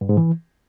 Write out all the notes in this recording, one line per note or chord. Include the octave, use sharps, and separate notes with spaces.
G2
G#2
E3